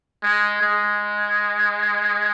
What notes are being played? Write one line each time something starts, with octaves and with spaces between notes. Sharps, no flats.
G#3
G#3